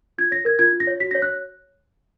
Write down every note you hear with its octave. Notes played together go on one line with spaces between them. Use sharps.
F4 G#6
C#5 A#6
A#4 G#6
F4 G#6
F4
A#6
C#5
F#4 B6
A#6
C#5
F#6